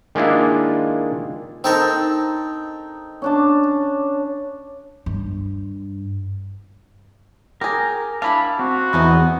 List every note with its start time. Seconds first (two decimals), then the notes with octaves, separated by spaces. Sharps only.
0.15 D#3 G#3 A#3 D4 E4 F4
1.64 C4 D#4 A4 A#4
3.22 C#4 D4 A5
5.06 G2
7.61 G4 G#4 A#4
8.22 D4 E4 E5 F5 B5
8.59 C4 F#4
8.93 E2 E3 B3 D#4